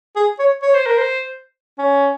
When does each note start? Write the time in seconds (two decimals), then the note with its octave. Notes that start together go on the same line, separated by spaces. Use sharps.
0.16 G#4
0.39 C#5
0.62 C#5
0.74 C5
0.86 A#4
0.98 C5
1.78 C#4